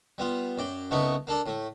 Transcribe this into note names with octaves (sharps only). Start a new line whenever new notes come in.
G3 B3 F4
F#2 D5 G5
C2 C#3 A3 B3 D#4 C#6
A#3 D4 A4 D5
A2 A3